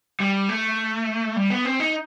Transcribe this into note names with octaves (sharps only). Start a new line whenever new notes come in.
G3
A3
G3
B3
C4
D#4